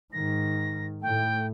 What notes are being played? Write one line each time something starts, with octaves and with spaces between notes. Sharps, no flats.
G#2 D#3 A#6
A2 A3 G5